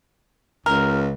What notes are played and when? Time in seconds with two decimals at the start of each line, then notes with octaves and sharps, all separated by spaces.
0.66 C#2 A#4